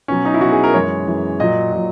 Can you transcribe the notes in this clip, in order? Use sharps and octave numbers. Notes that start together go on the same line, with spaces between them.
B2 F#3 C#4
D#4
E4
B2 F#3 F#4
G#4
A#4
F#2 E3 G#3 C#5
F#2 E3 G#3
A#2 F#3 D#5
A#2 F#3